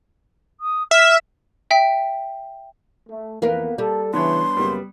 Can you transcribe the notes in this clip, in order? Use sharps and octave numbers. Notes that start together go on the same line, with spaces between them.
D#6
E5 F6
E5 G5 B6
A3
F2 E3 A#3 B3 A#4 F5
G3 A4
C#3 E3 B3 D4 C#5 C6
F#2 C#3 G3 A#3 B3